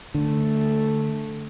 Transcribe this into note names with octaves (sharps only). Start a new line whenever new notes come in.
D3 A3